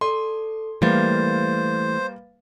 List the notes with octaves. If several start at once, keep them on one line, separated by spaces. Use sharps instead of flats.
A4 D5 C6
E3 G3 A3 A#3 B4 C5 F5 A6